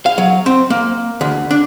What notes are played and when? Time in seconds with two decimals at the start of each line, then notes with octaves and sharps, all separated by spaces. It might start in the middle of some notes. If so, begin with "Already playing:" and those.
0.06 F5
0.18 F#3
0.46 C4
0.70 A#3
1.21 D2
1.51 D4